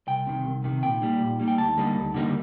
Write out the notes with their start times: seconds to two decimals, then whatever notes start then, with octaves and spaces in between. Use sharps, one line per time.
0.07 C2 G5
0.27 C3 D#3
0.45 C2
0.64 C3 D#3
0.83 A#2 G5
1.02 G3 A#3 D#4
1.20 A#2
1.40 G3 A#3 D#4
1.48 G5
1.58 D2 A5
1.77 D3 G3 A#3 D#4
1.96 D2
2.14 D3 G3 A#3 D#4